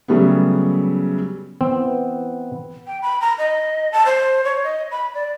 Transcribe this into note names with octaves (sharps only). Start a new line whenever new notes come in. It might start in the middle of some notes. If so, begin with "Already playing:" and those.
C#3 F#3 G3 A3 B3
E3 B3 C4
G5
B5
A#5
D#5
A5
C5
C#5
D#5
B5
D5